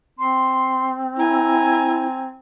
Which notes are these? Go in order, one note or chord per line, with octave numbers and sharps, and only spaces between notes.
C4 C6
E4 G#5 A#5